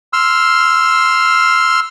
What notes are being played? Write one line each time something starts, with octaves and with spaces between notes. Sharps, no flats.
C6 E6 F6